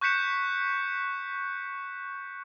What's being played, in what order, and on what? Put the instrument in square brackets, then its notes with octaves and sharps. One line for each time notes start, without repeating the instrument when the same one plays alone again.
[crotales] C#6 F#6 G6 B6 C#7 E7